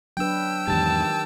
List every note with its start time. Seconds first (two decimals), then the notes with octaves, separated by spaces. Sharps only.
0.17 F#3 D4 B4 G5 E6
0.68 E2 G#2 D#3 G4 A5